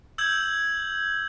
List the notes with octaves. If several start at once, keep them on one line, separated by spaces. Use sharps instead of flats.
E6 G6 G#6 F#7